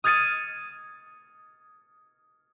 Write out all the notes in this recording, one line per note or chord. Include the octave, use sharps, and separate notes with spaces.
D#6 F6 G#6 A6 C#7 D#7